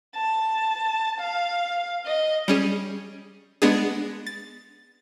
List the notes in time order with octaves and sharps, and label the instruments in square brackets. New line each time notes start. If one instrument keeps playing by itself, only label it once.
[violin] A5
F5
D#5
[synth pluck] G3 C#4 G#4
G#3 B3 D4 G#4
A6